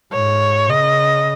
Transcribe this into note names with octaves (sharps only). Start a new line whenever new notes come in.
G#2 C#5
C#3 D#5